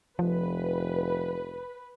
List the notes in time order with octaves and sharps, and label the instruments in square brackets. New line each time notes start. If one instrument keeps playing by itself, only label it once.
[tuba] F1 [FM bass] F3 [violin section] B4